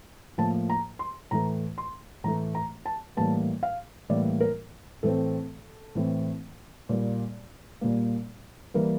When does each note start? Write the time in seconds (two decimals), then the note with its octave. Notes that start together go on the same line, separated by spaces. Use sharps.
0.38 A2 F3 A#3 A5
0.69 A#5
0.99 C6
1.31 A2 E3 A3 A#5
1.78 C6
2.24 A2 E3 A3 A#5
2.55 A#5
2.86 A5
3.17 A2 E3 G3 A#3 A5
3.63 F5
4.09 A2 E3 G3 A#3 D5
4.41 A#4
5.03 A2 E3 A3 C4 A4
5.95 A2 E3 A3 C4
6.89 A#2 G3 A#3
7.81 A#2 G3 A#3
8.74 E3 G3 A#3 A#4